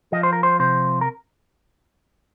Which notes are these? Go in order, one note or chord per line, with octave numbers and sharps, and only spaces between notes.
F3 D#5
C5
A#4
C5
C3 C5
A#4